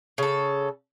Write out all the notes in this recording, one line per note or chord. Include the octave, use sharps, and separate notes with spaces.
C#3 A4